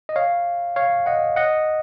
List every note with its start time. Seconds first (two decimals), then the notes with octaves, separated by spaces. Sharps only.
0.09 D#5
0.16 C#5 F5
0.76 C#5 F5
1.06 D#5 F#5
1.36 D#5 F#5